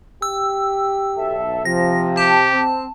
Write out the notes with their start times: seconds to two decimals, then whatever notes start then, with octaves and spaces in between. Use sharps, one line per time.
0.22 G4 E6
1.18 B1 A4 E5
1.65 C3 F3 A#6
2.17 G4 A5
2.51 C4